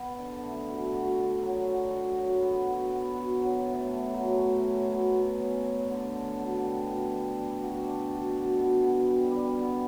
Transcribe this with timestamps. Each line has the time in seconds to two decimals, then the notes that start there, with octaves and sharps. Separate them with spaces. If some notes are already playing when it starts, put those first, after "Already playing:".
Already playing: B3
0.18 D3
0.42 A3
0.67 F#4
0.92 F#4
1.17 D3
1.42 F#3
1.66 F#3
1.91 F#4
2.16 F#3
2.40 B3
2.65 F#4
2.89 B3
3.14 F#4
3.39 F#3
3.64 A2
3.88 A3
4.13 F#3
4.37 A3
4.62 C#4
4.87 B2
5.12 B2
5.37 C#4
5.61 C#4
5.86 D3
6.10 D3
6.35 B2
6.60 G3
6.84 B2
7.09 G3
7.34 D4
7.59 F#4
7.83 D4
8.08 F#4
8.33 B2
8.57 B2
8.82 B2
9.06 G3
9.31 G3
9.56 B3